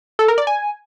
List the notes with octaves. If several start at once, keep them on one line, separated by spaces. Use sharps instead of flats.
A4
A#4
D5
G#5